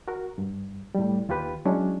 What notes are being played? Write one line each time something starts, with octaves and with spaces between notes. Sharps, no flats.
F#4 A#4
G2
A2 G3
D#2 F4 G4 B4
F#3 G#3 C#4 D4 E4